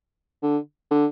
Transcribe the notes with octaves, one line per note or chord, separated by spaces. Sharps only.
D3
D3